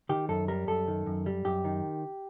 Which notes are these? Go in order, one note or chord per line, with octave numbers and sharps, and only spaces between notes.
D#3 G4
F#2 A4
G3 A#4
F#2 A4
D#3
F#2
G3
F#2 G4
D#3